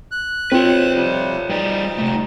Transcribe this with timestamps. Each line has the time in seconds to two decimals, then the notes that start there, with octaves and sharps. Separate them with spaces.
0.11 F#6
0.52 C4 F4 B4 C#5
0.95 C3 F3 G3
1.49 G3 D#4 G#4 D5
1.98 C3 A3